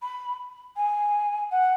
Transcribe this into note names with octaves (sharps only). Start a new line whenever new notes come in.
B5
G#5
F#5